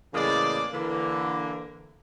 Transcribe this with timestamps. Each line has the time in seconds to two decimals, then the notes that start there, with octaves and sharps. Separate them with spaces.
0.14 A2 C#3 E3 G#3 A#3 D5
0.74 D3 E3 A#3